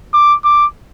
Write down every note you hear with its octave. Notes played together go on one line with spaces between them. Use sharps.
D6
D6